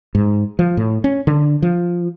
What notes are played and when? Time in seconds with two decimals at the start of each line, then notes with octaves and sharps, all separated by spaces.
0.15 G#2
0.59 F3
0.77 A2
1.04 C#4
1.27 D3
1.62 F3